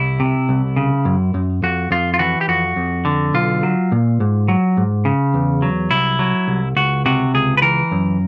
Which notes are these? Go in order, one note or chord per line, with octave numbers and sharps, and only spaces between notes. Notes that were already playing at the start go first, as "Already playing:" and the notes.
Already playing: C2 E4
C3
C2
C#3
F#2
F#2
F2 F#4
F2 F4
F4
E3 F#4
G4
F2 F#4
F2
D3
B1 F4
F#3
A#2
G#2
F#3
G#2
C#3
E2
F#3
C2 E4
F#3
C2
C#2 F#4
C3 F#4
C#2 G#4
B4
E3 A#4
F#2